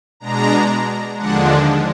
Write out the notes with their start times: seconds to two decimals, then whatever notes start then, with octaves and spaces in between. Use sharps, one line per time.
0.20 B2 G#3 D4 A#5
1.18 D#2 D3 F3 G#3 D4 F#5